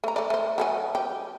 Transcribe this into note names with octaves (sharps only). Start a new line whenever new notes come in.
A3 A#5
A3 D5
A3 C5
F#3 A3 G#4
G4